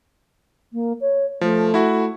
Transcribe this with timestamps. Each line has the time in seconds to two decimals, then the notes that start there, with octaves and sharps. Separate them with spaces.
0.73 A#3
1.01 C#5
1.41 F3 A3
1.74 E4 F#4